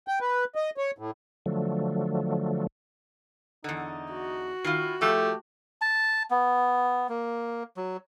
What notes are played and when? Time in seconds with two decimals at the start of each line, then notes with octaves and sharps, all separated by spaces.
0.08 G5
0.21 B4
0.55 D#5
0.77 C#5
0.98 A2
1.46 D3 F3 F#3 A3
3.64 E2 D3 D#4
4.12 F#4
4.64 D#3 E4 F4
5.02 F3 A3 G4
5.81 A5
6.30 B3
7.09 A#3
7.77 F#3